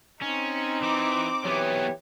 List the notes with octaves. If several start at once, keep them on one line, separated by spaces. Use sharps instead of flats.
C4 C#4 D#4
E3 D6
E3 F#3 B3 G4 C#5